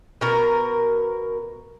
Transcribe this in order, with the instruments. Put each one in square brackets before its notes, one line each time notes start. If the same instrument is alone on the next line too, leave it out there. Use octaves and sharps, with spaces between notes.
[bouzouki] B2 A#4